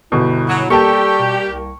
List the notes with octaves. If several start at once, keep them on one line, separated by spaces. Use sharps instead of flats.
G1 B2 E4
F#3
G3 A#3 G4 A4 G5 A5 C#6
B2
C2